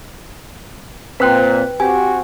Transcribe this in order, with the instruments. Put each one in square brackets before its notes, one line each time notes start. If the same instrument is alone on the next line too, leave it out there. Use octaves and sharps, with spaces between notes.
[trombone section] A#2 [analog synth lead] C4 [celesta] B4 G5 [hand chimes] F#6 B6
[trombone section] C4 F#4 [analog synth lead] G4 [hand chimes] G#5